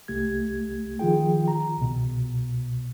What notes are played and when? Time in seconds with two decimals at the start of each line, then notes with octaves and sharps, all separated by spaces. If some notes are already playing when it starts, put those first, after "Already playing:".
0.08 C2 A3 G4 G#6
0.99 D#3 F3 F4 G#4 G5
1.48 A#5
1.78 C2 B2